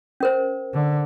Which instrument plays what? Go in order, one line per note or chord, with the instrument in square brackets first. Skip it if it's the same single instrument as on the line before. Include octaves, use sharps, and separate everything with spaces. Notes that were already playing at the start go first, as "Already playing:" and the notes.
[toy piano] C#4 A#4 C5
[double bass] D3